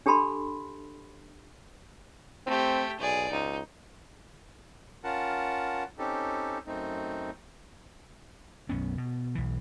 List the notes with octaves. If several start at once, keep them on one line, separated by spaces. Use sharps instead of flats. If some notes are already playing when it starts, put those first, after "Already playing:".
D4 G4 A4 A5 B5 C6
A3 C4 G4
B1 G#4 D5
C#2 D#4
C#4 F4 A#4 F#5 A5
C4 C#4 D#4 G4 A4
F#2 A3 C4 D#4
B1 F#2 B3 C#4
B2
B1 E3